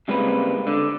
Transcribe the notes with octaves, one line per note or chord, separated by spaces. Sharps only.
C#3 G3 G#3 A#3 C4 B4
D3